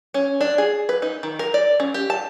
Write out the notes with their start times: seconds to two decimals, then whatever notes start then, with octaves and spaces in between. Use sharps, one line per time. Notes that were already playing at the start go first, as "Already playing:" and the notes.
0.14 C#4
0.41 D4
0.58 G#4
0.89 B4
1.02 D#4
1.23 D#3
1.39 A#4
1.54 D5
1.80 C#4
1.94 G4
2.10 A5